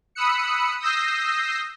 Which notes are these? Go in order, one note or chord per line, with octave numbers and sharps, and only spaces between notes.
B5 D#6 E6 F#6 C#7
D#6 E6 G6 A#6 C7